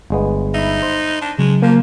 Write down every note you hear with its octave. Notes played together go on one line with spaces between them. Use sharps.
G1 G#3 B3
D#4 E5 B5
C5
D4
C#3 F#3 G#3
F3 A#3